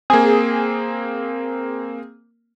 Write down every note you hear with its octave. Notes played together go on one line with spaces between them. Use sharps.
A#3 C4 G#4